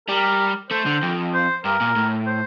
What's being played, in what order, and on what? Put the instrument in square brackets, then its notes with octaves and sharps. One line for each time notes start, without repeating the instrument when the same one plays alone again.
[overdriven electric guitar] G3 [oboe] A#4
[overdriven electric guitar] A3 [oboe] C5
[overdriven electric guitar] D3
F2
[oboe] C5
[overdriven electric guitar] G2 [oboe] A#4
[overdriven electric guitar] A#2
A2
[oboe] C5